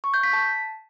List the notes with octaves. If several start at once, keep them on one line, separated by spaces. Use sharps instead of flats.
C#6
G6
B6
A5